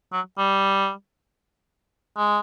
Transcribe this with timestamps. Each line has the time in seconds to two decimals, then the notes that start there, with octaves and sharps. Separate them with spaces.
0.13 F#3
0.38 G3
2.17 G#3